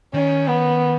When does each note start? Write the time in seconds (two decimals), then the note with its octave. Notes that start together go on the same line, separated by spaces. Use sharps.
0.14 D#3 C#4
0.48 B3